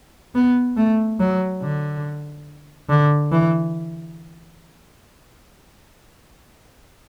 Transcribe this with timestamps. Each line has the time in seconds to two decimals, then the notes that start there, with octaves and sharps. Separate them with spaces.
0.35 B3
0.77 A3
1.20 F#3
1.62 D3
2.89 D3
3.32 E3